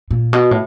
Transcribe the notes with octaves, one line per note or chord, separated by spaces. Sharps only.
A#2
B2
A2